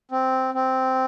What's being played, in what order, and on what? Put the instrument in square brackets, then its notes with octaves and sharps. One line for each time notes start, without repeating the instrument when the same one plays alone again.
[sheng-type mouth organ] C4
C4